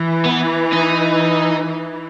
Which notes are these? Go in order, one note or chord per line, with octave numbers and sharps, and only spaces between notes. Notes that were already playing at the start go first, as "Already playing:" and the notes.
Already playing: E3
B3
D#4
E3